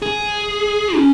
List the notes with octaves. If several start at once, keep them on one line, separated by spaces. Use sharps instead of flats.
G#4
C#4